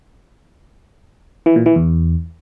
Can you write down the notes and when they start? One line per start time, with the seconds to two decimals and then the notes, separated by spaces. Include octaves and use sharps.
1.46 E3
1.56 A#2
1.66 E3
1.76 E2